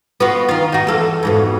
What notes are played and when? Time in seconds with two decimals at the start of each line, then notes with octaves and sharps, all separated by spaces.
0.20 B3 F4 F#4
0.49 D#3 F4
0.72 D#4 F#4
0.87 E2 A4 F5
1.23 F2 G#2 B2